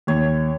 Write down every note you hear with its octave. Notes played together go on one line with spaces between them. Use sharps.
D#2 C#5